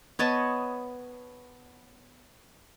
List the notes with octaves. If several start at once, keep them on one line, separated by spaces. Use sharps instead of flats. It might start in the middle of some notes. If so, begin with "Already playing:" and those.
B3 C#5 D#5 A5